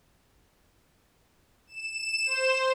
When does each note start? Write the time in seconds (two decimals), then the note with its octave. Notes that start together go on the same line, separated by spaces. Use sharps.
1.67 E7
2.26 C5